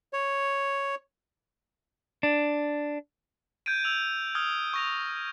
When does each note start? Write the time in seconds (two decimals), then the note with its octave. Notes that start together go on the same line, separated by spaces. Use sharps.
0.13 C#5
2.23 D4
3.66 G6 G#6 D7 D#7
3.84 E6 F7
4.35 D#6 F6 G#6
4.73 C#6 A#6 F7